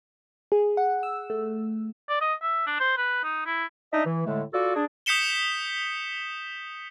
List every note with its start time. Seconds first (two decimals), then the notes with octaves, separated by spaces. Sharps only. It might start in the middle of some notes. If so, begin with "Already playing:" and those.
0.52 G#4
0.77 F#5
1.03 E6
1.30 A3
2.09 D5
2.21 D#5
2.42 E5
2.67 D4
2.80 C5
2.97 B4
3.24 D#4
3.46 E4
3.92 D4 D#4 D#5 E5
4.05 E3
4.25 A2 D3 G#3 A3
4.53 F4 F#4 A4 D5
4.75 D4 G#4
5.06 D#6 G6 B6 C#7 E7 G7